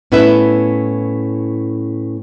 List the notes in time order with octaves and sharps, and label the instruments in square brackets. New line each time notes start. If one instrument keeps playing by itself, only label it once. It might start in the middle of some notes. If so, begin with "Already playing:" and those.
[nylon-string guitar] A2 B3 C#4 E4 B4 E5